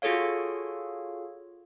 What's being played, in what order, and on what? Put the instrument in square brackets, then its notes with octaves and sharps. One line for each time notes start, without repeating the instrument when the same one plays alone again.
[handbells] F4 F#4 G#4 A4 C#5 F5